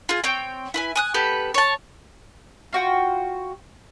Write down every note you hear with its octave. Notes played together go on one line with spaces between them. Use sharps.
F4 G#4
C4 C#5 G5
E4 B4 G#5
G#5 D#6 F#6
B3 G4 A4 B4
C#5 A5
F4 F#4 G5